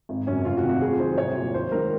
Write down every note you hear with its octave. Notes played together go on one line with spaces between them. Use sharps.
G#1
F#2 C#3 F#3 C#4
F1 F4
F#4
F2 C3 D#3 F#3
F#4
F2 G#4
D#3 F#3 C5
C2 C#5
A#2 F#3
D#2 C5
D#3 G#3 A#4